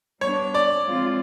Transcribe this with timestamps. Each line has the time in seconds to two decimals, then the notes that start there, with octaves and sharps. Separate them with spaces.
0.21 G3 B3 D4 C#5
0.54 D5
0.87 F3 G#3 C4 F4